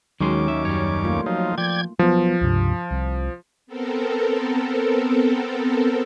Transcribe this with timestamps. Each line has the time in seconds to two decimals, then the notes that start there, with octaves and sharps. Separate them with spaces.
0.21 D#2 D#3 F#3 G#3 C#4 C6 D6
0.48 D#4 E5
0.65 F#2 G3 C#5
1.04 A3 A#3 F4
1.26 F3 F#3 D#4
1.58 F3 D5 G5 G#6
1.99 F3 F#3 B3
2.41 C#2 G2 C3
2.91 C2
3.67 B3 C4 A4 A#4